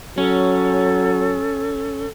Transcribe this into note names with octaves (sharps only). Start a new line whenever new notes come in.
F#3 C#4 A4